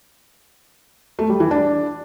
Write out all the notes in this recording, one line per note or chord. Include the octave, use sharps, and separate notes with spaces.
A3
G3
E3
D4